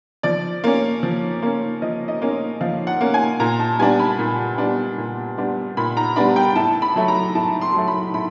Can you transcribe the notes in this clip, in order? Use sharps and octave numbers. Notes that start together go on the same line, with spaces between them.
F3 D5
A#3 C#4
F3
A#3 C#4
F3 D#5
D#5
A#3 C#4
F3 F5
F#5
A#3 C#4
G#5
A#2 A#5
A5
G3 B3 D4 G#5
B5
A#2
G3 B3 D4
A#2
G3 B3 D4
A#2 B5
A#5
G3 B3 D4 B5
G5
A2 A5
B5
F#3 A3
A#5
A2 A5
C6
F#3 A3
B5
A2 B5